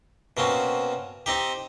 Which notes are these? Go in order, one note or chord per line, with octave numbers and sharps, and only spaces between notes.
B2 A#3 C4 C#4
C4 D#4 G4